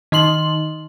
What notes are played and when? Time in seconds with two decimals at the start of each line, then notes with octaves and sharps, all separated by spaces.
0.12 D#3 D#4 C6 F#7